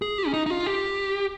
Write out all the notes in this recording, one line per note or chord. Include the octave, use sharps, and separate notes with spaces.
G#4
G4
C#4
D#4
D#4
F4
G4